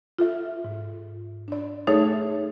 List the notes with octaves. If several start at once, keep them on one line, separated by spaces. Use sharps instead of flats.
F4 A4 E5
G#2
D4 D5
A3 D#4 G#4 A4 C#5 E5